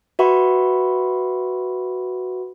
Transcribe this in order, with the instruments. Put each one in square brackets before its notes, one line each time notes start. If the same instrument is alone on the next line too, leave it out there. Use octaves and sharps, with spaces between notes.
[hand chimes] F#4 B4 E5 F#5 B5 C#6